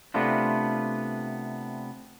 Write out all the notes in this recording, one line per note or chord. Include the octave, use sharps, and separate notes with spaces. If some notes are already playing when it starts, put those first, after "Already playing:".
C3 A3 B3 D4 F4